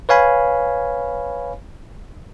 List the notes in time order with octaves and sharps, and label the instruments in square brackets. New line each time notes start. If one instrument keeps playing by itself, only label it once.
[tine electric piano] B4 C#5 F5 G#5 B5